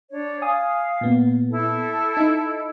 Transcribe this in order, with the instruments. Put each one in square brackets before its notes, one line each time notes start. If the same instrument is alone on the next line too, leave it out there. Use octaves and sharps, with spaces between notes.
[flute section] D4 C#5
[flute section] F5 [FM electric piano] G#5 D#6
[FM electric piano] A#2 B3
[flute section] E4 A4
[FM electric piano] D#4